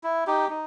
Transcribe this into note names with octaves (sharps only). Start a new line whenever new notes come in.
E4
D#4 G4
D#4